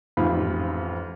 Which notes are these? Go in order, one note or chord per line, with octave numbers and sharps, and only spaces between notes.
A1 F2 G#2 F4 B5